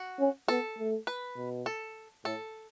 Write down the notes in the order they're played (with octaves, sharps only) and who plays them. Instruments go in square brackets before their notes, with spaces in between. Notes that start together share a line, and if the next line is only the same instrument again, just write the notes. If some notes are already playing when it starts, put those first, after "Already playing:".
Already playing: [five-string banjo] F#4
[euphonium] C#4
[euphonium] B3 [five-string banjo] A4
[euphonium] A3
[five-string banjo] B4
[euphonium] B2
[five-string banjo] A4
[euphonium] A2 [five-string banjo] A4